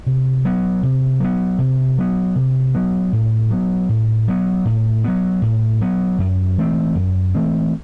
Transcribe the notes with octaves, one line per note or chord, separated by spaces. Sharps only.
C3
F#3 B3
C3
F#3 B3
C3
F#3 B3
C3
F#3 B3
A2
F#3 B3
A2
F#3 B3
A2
F#3 B3
A2
F#3 B3
F#2
E3 A3 C4
F#2
E3 A3 C4